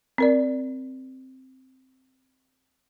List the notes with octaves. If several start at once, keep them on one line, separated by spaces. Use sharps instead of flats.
C4 A#4 D5